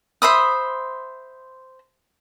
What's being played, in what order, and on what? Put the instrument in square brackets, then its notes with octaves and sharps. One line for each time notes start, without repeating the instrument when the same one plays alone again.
[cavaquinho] C5 E5 B5 D#6